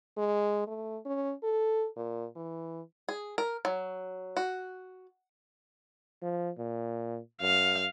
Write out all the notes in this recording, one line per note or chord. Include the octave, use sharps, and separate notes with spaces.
G#3
A3
C#4
A4
A#2
E3
G#4
A#4
F#3
F#4
F3
A#2
F#2 F5